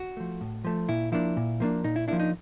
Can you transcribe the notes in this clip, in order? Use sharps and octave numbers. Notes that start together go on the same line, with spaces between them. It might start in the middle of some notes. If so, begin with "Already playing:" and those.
Already playing: F#4
F3 A3
A2
F3 A3
A#2 E4
F3 A#3 D4 E4
A#2
F3 A#3 D4
A#2 D#4
E4
F3 A#3 D4 E4
D#4